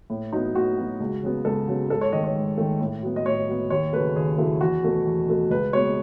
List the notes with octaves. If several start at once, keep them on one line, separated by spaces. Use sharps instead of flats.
A2
F#3 B3 D#4
A2 F#4
F#3 B3
C#2
C#3 F#3 B3
C#2 A4
C#3 F#3 B3
G#2 A4
C#5
D#3 A3 D#5
C#5
G#2
D#3 A3
A2
F#3 B3
D#5
A2 C#5
F#3 B3
D#2 C#5
C#3 F#3 A3 B4
D#2 G#4
C#3 F#3 A3 E4
E2 F#4
B2 A3
E2
B2 A3
C#2 B4
B2 G#3 B3 C#5